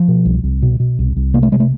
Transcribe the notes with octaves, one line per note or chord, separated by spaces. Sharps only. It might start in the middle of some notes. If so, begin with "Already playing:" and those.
Already playing: F3
B2
C2
C2
B2
B2
C2
C2
C3 A#3
A3
C3 G#3
A3